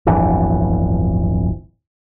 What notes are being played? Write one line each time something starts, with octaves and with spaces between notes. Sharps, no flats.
D1 G1 F2 E3